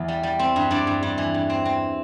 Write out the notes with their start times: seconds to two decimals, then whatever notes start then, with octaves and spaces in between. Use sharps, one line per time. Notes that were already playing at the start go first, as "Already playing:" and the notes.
Already playing: E2
0.08 G3
0.23 G3
0.39 C4
0.56 G2
0.71 G2 D5
0.87 G2
1.03 G2
1.18 E3
1.34 G2
1.50 C4
1.65 C4